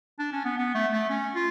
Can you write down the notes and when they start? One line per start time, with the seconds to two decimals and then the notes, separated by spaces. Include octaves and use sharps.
0.19 D4
0.32 C#4
0.45 B3
0.58 B3
0.75 A3
0.92 A3
1.09 C#4
1.35 F4